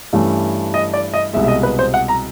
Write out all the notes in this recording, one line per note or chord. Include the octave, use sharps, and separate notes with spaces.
G2 E3 A3 C#4
D#5
D5
D#5
C2 B2 G#3 E5
E5
D#5
B4
C5
F#5
A#5